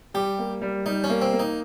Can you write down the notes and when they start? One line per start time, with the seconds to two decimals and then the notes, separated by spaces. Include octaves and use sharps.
0.14 G3 G4
0.39 A#3
0.62 G3
0.86 G3 D#4
1.04 C#4
1.09 A#3
1.22 C4
1.33 A#3
1.39 D#4